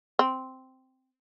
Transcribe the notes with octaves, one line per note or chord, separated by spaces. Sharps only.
C4